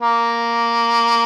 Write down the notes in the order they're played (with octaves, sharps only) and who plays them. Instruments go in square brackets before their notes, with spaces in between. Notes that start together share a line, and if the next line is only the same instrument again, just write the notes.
[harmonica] A#3